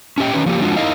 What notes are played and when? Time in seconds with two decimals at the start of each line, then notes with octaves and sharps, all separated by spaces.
0.18 C#4 D4 G4 D#5 G5
0.33 D#3 C#4 B4
0.46 F3 A#3 G4
0.60 F3 G#3 D4 F4 F#4
0.77 D#4 E4 A#4 D#5 F5